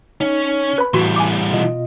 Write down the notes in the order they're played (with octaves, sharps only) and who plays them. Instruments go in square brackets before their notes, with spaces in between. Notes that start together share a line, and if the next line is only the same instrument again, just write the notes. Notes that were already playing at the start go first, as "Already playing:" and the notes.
[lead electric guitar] C#4 [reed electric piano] D#4
[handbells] B4 B5
[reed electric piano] A2 [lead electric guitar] E3 G3 [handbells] F#4 C6
[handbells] G#5 D6
[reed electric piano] B2 F4 D#5